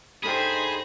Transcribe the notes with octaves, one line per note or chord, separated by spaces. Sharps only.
G2 D#4 G#4 A4 C5 G5 B5